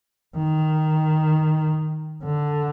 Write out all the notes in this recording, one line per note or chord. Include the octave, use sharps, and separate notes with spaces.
D#3
D3